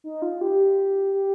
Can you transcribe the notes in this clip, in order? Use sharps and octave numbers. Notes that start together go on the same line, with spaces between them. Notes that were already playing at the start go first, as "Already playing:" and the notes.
D#4
F4
G4
G4